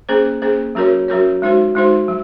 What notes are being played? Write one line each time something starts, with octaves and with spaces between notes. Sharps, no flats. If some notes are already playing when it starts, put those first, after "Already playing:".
A#3 C#4 G#4 C5
A#3 C#4 G#4 C5
F#3 C#4 F#4 A#4 C#5
F#3 C#4 F#4 A#4 C#5
G#3 D#4 F#4 C5
G#3 D#4 F#4 C5
F#3